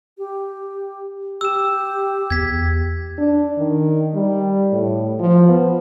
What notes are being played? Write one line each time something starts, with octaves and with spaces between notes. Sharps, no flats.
G4
G4 E6 E7
E2 G#6 B6
D4
D#3
G3
A2
F3
B3